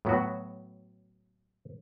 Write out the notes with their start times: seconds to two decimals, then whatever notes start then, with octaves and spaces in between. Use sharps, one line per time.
0.05 A2 F#3 B3 F#4